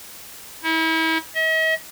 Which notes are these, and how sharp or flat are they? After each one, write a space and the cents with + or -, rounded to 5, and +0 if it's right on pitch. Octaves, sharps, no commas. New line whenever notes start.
E4 -35
D#5 +45